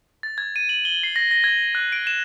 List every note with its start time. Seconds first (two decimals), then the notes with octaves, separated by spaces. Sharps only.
0.23 A6
0.38 G#6
0.56 D#7
0.69 F#7
0.85 G7
1.03 C7
1.16 A#6
1.31 A#6
1.44 G#6
1.75 F#6
1.92 D7
2.07 E7